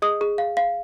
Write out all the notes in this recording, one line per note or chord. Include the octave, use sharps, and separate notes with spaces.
G#4 D#5 D#6
G#4
F5
F5